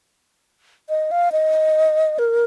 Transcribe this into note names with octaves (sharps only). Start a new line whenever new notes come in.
D#5
F5
D#5
A#4